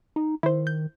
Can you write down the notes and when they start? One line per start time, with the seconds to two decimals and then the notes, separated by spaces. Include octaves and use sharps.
0.16 D#4
0.43 D#3 E4 C5
0.67 G6